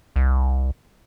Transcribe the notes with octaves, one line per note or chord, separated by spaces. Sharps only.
C2